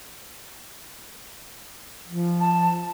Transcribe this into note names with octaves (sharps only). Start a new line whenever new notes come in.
F3
A5